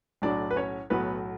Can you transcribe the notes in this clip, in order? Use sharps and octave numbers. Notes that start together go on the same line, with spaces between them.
B1 A2 F#3 D4 D5
B4
C#4 C#5
B1 A2 F#3 B3 B4